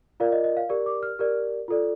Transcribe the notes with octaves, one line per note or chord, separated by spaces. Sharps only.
F4 A#4 D5 F5
D#5
D#5
F5
G4 A#4 D5
D6
F6
G4 A#4 D5
F4 A4 D5